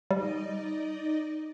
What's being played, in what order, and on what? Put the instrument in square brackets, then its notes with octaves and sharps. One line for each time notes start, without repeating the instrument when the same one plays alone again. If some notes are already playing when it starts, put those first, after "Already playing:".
[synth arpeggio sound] G3 [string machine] D#4 D5 D#5